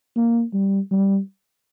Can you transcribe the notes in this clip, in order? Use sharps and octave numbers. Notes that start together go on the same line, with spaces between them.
A#3
G3
G3